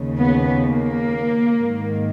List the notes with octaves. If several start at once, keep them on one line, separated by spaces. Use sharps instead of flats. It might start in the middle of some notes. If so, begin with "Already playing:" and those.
Already playing: D#2 C#3
B3
A#3
G#2
D#3